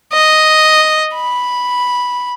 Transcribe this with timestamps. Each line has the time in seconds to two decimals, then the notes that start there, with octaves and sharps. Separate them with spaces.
0.13 D#5
1.15 B5